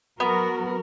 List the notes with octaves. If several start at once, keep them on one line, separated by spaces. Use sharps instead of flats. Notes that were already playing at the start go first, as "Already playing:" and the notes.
F#3 B3 F#4 A#4